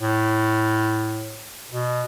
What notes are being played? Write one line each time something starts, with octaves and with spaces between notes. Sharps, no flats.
A2
B2